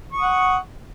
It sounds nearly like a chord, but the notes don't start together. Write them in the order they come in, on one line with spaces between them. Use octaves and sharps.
C#6 D#6 F#5